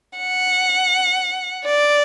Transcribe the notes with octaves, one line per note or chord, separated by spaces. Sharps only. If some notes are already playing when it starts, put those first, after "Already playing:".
F#5
D5